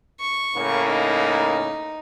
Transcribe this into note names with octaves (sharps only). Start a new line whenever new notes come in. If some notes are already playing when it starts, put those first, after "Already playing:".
C#6
A2 C#3 A#3
D#4